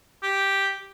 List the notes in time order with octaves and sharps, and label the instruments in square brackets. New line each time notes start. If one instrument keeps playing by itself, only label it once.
[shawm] G4